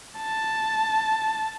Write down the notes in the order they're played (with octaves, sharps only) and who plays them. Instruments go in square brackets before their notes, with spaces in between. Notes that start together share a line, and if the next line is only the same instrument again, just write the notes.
[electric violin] A5